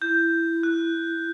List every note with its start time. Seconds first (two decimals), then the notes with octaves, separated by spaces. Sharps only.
0.02 E4 G6
0.63 F#6